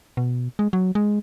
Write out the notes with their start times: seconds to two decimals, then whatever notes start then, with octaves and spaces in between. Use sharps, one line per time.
0.17 B2
0.59 G#3
0.73 F#3
0.95 G#3